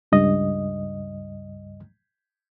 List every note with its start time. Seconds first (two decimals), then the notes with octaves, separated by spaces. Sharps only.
0.12 C#2 G2 D#5